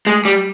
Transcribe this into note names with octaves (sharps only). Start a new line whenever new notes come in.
G#3
G3